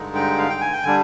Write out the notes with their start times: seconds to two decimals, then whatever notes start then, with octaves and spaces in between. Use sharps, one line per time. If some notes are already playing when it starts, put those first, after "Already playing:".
Already playing: G2 D3 G#3 D#4
0.15 G5
0.38 F5
0.50 G5
0.61 G#5
0.73 G5
0.83 D3 G3 D4 G#5